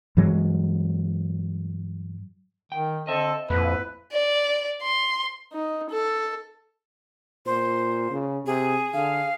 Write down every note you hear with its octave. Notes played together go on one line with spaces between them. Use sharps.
G2 E3 F#3 G#3
D#3 G5
D3 C4 A4 D#5 E5
F2 A#2 B3 E4 B4
D5
C6
D#4
A4
A#2 C5
C#3
C3 G#4
D3 F5